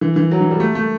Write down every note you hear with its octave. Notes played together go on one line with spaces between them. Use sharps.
E3
E3
F#3
E3
G3
A3
A3